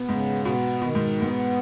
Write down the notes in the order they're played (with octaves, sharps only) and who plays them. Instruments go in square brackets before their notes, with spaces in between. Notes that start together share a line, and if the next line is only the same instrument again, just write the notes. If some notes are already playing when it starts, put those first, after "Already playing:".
Already playing: [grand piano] B2 [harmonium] B3
[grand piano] G#2 [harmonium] C#3
[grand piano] B2 [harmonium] B3
[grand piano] B2 [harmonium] D#3
[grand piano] G#2
[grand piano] G#2 [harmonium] B3